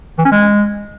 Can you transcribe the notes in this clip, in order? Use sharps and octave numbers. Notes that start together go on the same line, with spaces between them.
E3
C#4
G#3